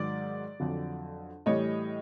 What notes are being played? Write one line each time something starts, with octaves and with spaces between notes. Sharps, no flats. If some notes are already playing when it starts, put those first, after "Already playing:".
Already playing: G#2 D#3 F#3 D5
F2 D3 F#3
A2 E3 G3 C#5 D#5